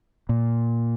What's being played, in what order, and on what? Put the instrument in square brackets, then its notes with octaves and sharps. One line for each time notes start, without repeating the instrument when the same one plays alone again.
[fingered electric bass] A#2